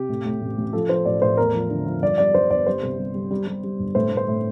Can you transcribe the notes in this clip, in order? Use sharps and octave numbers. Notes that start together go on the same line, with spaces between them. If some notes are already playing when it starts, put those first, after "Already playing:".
Already playing: C3 G4
A2
A2
A1
A1
F3 A4
F3 C5
A1 D5
A2 C5
E2 A#4
F3
D3
F3
G2 D5
G3 D5
G2 C5
G1 D5
G3 C5
C2
G3
G3
G3
G3
G3
G1
A2 C5
A2
C5
A2